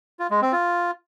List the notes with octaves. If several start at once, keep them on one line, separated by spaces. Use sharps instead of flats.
F4
G#3
C4
F4